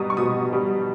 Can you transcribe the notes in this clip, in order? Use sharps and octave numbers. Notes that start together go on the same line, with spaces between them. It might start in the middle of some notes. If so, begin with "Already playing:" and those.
Already playing: B2 G3 A#5 D#6
C#6
B2 D#6
G3